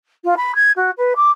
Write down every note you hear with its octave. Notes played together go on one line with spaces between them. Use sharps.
F4
B5
G#6
F#4
B4
D6